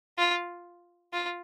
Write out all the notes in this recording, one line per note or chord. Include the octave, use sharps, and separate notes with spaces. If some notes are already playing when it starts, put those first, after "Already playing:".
F4
F4